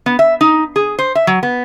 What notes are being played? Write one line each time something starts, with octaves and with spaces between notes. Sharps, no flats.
B3
E5
D#4
G#4
C5
E5
F#3
B3